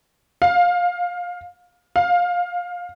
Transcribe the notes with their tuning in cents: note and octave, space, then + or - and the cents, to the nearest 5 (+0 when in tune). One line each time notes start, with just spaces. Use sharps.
F5 +20
F5 +20